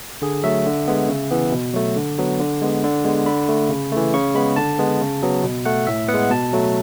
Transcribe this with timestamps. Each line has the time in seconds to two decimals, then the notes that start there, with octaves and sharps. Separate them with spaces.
0.22 D3 G#4
0.43 F#3 A3 E5
0.66 D3
0.88 G#3 B3
1.09 C#3
1.31 E3 B3
1.52 B2
1.74 F#3 A3
1.97 D3
2.18 F#3 B3
2.40 D3
2.62 G#3 B3
2.84 D3
3.05 G#3 B3
3.26 D3 B5
3.49 A3
3.69 C#3
3.92 E3 A3
4.13 C#3 C#6
4.35 G#3 B3 B5
4.56 D3 A5
4.79 G#3 B3
5.01 C#3
5.23 F#3 B3
5.44 B2
5.65 A3 F#5
5.87 A2 E5
6.09 B3 F#5
6.14 G#3
6.31 B2 A5
6.53 F#3 A3